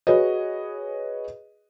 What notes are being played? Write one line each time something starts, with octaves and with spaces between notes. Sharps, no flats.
F#4 G#4 B4 C#5 D#5